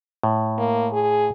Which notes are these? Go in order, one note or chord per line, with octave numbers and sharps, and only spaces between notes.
A2
A#3
G#4